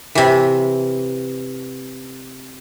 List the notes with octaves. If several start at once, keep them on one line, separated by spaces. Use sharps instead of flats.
C3 E3